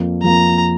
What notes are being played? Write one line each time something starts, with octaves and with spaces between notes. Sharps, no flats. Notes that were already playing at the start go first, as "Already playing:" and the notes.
Already playing: F2 F3 A#3
F2 F3 A#3 A#5